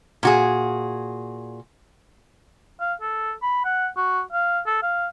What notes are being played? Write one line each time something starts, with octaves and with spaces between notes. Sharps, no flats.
A#2 F#4 G#4
F5
A4
B5
F#5
F#4
F5
A4
F5